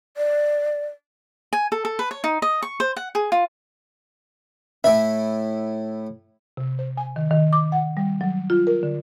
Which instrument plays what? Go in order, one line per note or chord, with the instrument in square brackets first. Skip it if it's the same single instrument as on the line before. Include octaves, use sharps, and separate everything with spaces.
[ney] D5
[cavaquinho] G#5
A4
A4
B4
C#5
D#4
D#5
C#6
C5
F#5
G#4
F4
[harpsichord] A2 E4 B5 [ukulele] E5
[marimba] C3
C5
G#5
D#3
D#3
D6
F#5
G3
F#3
F4
A#4
D3